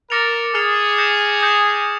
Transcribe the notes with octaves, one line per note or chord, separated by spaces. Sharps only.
A#4 D6 F6 A6 C#7 F7
G#4 D6 F6 A6 C#7 F7
D#6 G6 A#6 C#7 E7
D#6 G6 A#6 C#7 E7